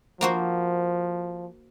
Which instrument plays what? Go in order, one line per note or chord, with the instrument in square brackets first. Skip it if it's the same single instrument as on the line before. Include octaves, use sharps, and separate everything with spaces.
[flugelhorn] F3 [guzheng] A#3 F#4 C5